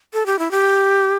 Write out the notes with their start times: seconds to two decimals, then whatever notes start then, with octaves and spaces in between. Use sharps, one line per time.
0.13 A4
0.26 G4
0.39 E4
0.51 G4